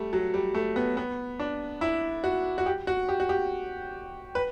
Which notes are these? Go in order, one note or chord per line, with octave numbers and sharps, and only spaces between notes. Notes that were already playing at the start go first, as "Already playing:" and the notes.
Already playing: G3 A3
F#3
G3
A3
B3
B3
D4
E4
F#4
F#4
G4
F#4
G4
F#4
G4
B4